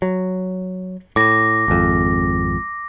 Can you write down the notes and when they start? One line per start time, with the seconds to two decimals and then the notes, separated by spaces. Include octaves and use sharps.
0.02 F#3
1.16 A2 D6 A#6
1.68 G#1 F2